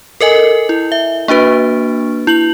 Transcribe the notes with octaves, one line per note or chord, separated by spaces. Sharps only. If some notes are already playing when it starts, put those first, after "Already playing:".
A4 A#4 D#5 G#5
E4
E5
A#3 D4 F#4 B4
E4 F#7